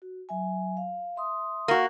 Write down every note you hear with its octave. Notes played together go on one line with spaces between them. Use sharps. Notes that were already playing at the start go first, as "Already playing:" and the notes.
F#4
F#3 E5 G#5
F5
E5 C6 D#6
A#3 F#4